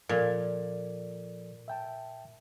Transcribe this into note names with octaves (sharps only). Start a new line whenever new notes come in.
A#2 F3 A4 D5
E5 G5 A5